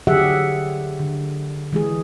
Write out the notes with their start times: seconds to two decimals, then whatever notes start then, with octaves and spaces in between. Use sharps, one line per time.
0.07 D3 F#3 G4 G#4 E5 F#5
0.99 D3
1.73 E3 G#3 G#4